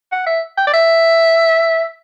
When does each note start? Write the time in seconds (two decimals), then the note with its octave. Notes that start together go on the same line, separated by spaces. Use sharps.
0.12 F#5
0.27 E5
0.58 G5
0.67 D5
0.74 E5